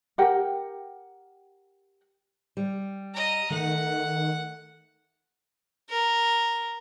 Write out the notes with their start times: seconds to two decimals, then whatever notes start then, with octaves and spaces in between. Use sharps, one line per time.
0.18 G4 A#4 F#5 G5
2.57 G3
3.13 D#5 A#5
3.51 D#3 A3 F#5
5.90 A#4